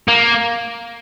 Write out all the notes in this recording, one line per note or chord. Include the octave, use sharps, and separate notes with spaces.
A#3